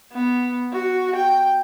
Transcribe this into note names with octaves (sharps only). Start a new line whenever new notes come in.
B3
F#4
G5